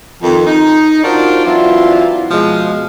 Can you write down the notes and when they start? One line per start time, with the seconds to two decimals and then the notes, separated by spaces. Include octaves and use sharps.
0.23 F2 D#3
0.46 D#4
1.04 D4 F4 F#4 A#4 C5 D5
1.44 E3 F#3 C4 D4 E4 F4
2.31 B2 F3 G#3